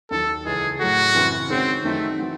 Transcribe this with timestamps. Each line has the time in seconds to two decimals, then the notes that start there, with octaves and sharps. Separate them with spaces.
0.11 D#2 D#3 F#3 A4
0.45 C#2 C#3 E3 G#3 C#4 G#4
0.80 A2 F#3 A3 F#4
1.15 F#2 C#3 E3 C4
1.49 D#3 G#3 C4 C#4 F#4
1.84 F#2 D#3 F#3 A3 C4 D#4
2.19 E3 C4 F#4